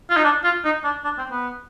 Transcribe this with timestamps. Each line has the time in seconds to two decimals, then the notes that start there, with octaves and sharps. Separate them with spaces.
0.10 F4
0.17 D#4
0.24 D4
0.44 F4
0.64 D#4
0.84 D4
1.04 D4
1.18 C4
1.31 B3